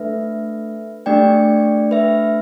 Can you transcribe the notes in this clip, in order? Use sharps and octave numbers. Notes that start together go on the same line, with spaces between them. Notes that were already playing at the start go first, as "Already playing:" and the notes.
Already playing: A3 D4 A4 B4 E5
A3 D4 G4 D5 G5
B4 E5